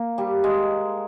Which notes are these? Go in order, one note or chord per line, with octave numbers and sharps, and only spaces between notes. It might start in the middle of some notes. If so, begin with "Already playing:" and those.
Already playing: A#3
G3
G#3